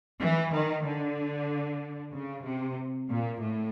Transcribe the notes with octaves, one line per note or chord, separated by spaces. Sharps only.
E3
D#3
D3
C#3
C3
A#2
A2